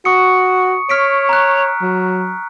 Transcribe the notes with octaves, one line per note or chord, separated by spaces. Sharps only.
F#4 C#6 D#6 C#7
C#5 F6 B6 D7
A#5 F#6
F#3